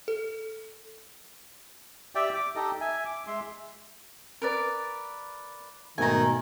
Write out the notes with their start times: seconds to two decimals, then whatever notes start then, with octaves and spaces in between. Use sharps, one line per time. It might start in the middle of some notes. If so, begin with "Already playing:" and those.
0.08 A4
2.15 G4 D5 E5 G5
2.34 D6
2.56 D#4 G4 A4 D#5
2.80 E5 G#5
3.05 D6
3.27 G#3 E5 C6
4.42 A#4 B4 D5
5.98 G#2 B2 D#3 A3 G#5 A#5